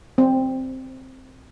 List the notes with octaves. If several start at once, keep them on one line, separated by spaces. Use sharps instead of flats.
C4